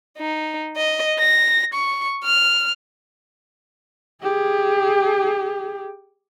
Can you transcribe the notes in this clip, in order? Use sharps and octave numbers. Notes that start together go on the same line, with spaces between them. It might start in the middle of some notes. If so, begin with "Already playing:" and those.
D#4
D#5
A#6
C#6
F6
G4 G#4